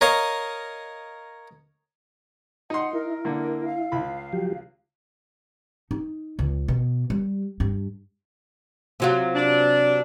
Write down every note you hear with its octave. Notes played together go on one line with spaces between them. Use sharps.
A#4 C#5 D#5 F5
D#4 F#5 C6
E4 A#4
D3 A#3
F5
C#2 B5
F3 F#3 G4
D#4
C#2
B2
G3
G2
C3 F#3 F4
D4